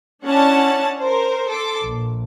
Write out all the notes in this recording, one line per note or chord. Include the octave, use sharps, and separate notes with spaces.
C#4 D4 E4 C#5 F#5 A5
A#4 C5
A4 C6 D6
A#1